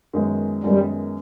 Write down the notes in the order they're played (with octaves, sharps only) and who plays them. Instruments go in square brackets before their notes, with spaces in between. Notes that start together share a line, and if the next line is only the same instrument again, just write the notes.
[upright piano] F#2 D#3 G#3 B3
[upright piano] F#2 D#3 G#3 B3 [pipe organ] G3